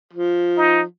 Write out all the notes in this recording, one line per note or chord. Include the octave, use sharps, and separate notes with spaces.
F3
D#4